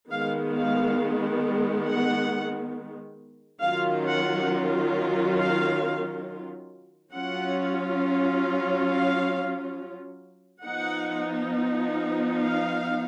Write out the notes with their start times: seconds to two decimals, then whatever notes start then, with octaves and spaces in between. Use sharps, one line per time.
0.11 D#3 G#3 B3 F5
0.56 F5
1.87 F#5
3.62 D#3 F#3 C#4 F4 F5
4.06 F#5
5.38 F5
7.13 F#3 C#4 F4 F#5
8.88 F5
10.64 F3 B3 D#4 F#5
12.38 F5